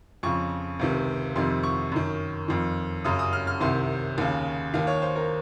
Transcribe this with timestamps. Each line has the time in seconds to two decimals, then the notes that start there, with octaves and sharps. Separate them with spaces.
0.23 F2 C#3 C#6
0.79 C#2 C3 D#3
1.36 F2 C3 D#3 C6
1.63 C#6
1.92 F#2 D#3
2.48 F2 D#3
3.05 F#2 C#3 D#6
3.19 D#6
3.33 F6
3.47 F6
3.60 C2 C3 D#3 C6
4.18 D#2 C#3
4.74 D#2 D#3 F5
4.87 C#5
5.02 C5
5.16 A#4